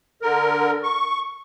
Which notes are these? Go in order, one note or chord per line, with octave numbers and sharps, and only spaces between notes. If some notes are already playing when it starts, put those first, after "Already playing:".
D3 A#4
C#6